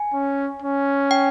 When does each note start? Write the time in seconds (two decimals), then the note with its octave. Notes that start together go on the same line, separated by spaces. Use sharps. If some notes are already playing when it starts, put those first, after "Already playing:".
Already playing: G#5
0.14 C#4
0.62 C#4
1.11 G5